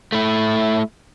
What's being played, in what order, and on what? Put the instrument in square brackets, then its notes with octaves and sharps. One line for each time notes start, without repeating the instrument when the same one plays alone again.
[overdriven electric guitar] A3 E4